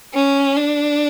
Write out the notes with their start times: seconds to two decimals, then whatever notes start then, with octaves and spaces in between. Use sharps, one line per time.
0.14 C#4
0.57 D4